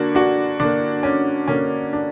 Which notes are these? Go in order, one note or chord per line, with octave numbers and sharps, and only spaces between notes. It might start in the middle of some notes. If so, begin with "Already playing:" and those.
Already playing: D3 A#3 D4 F#4
D4 F#4
D3 A#3 D4
C#4
D3 A#3 C#4
D4